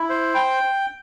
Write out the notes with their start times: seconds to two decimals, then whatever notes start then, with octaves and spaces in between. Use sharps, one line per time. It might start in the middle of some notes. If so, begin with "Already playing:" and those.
Already playing: E4
0.09 C5
0.35 G5